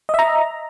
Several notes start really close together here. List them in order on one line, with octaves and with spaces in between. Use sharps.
D#5 E5 A#5